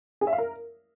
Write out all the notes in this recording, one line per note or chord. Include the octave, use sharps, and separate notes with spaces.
G#4
E5
F5
A#4